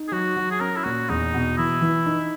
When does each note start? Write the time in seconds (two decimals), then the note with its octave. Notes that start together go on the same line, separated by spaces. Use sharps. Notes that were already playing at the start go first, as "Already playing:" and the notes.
Already playing: D#4
0.08 G#4
0.12 F#3 F#4
0.36 F#3
0.51 G#4
0.60 C#4 A#4
0.77 E4
0.84 A#2 F#4
1.10 E2 D#4
1.34 B2
1.58 E3 E4
1.81 E3
2.06 D#4